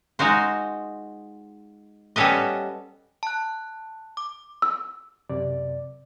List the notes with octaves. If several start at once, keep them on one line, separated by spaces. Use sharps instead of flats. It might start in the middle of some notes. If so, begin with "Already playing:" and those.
G#3 D#4 F4 F#4 C5
G3 B3 C#4 A4 B4 D#5
A5 F#6
D6
E6
F#2 C3 D5